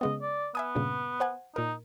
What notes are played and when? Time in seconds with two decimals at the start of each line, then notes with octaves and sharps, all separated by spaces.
0.01 C#3 G#3 B3 D#5
0.22 D5
0.55 B3 E5 G#5 D#6
0.75 G2 A#2 C#3
1.20 C5 F#5 G#5
1.56 A#2 D#4 A#4